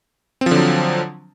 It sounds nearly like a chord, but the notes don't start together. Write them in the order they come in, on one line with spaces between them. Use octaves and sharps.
C4 F3 D3 F#3